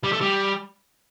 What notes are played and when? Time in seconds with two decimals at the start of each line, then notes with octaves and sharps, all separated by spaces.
0.03 G3
0.12 A3
0.21 G3